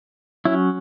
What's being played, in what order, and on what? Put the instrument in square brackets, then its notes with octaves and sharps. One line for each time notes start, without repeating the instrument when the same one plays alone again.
[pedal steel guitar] F#3 C#4 E4